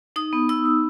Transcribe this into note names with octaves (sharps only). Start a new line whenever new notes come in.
D#4 D#6
B3
D#4 E6
D#4